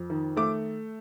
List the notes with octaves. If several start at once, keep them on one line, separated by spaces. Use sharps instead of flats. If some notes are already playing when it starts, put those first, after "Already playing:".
Already playing: F2
D#3
A3 D6